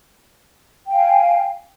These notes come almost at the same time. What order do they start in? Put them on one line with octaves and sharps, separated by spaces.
G5 F5 G#5